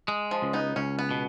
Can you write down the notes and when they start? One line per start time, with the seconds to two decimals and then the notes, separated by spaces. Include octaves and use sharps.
0.08 G#3
0.31 F3
0.42 C#2
0.53 B3 D#4
0.76 C#2 C#4
0.99 B3
1.11 B2